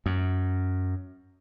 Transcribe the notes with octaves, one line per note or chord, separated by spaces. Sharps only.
F#2